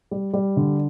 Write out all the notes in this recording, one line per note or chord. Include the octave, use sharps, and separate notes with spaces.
G3
G3
D3